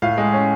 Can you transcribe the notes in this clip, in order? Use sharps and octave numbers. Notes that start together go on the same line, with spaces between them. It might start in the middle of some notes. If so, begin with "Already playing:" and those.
A2 F5
G#3
C#4